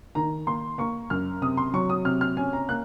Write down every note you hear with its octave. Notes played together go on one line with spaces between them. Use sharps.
D#3 A#5
A#3 C6
A#3 C#6
F#2 F6
C3 D#6
C6
F#3 C#6
D#6
C3 F6
F6
C#4 G#5
A#5
A#3 F#6